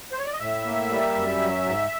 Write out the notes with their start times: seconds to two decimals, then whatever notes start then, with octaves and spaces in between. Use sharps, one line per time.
0.12 C5
0.19 C#5
0.25 D5
0.33 D#5
0.40 A2 E5
0.65 A#3
0.90 G3
1.15 F#2
1.41 F#3
1.66 G#2